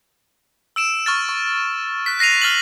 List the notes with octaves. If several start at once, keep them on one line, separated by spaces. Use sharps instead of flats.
E6 D7 E7
C#6 F6 A6
C#6
F#6 B6
F#6 A#6 C7 D#7 F7
F6 A6 F7 F#7